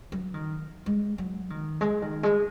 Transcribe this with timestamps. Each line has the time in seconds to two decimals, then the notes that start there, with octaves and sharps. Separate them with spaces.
0.12 F#3
0.34 D#3
0.86 G#3
1.18 F#3
1.50 D#3
1.81 G#3
2.02 D#3
2.23 G#3